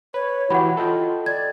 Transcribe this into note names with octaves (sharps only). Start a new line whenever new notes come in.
B4 C#5
E3 E4 F#4 G4 F#5 B5
F4 A4 D#5 G5
D5 G#6